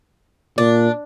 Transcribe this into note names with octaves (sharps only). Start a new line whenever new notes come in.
A#2 D4